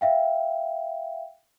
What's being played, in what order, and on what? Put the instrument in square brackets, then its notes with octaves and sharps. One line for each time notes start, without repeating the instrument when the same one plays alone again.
[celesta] E5 F5 G5